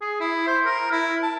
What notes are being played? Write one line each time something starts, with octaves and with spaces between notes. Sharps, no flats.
G#4
E4
C5
A#4
E4
A5